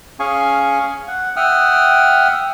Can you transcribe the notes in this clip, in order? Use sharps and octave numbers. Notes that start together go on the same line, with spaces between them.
C#4 G#4 F5 G#5 C#6
F#5
E5 F#5 G5 D#6 F6